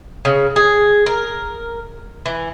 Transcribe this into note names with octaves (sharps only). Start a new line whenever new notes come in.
C#3
G#4
A#4
E3